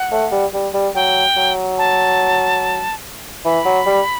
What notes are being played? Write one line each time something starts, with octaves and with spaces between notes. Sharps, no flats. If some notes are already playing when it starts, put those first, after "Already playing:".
Already playing: F#5
A3
G3
G3
G3
F#3 G5
F#3
A5
E3 B5
F#3
G3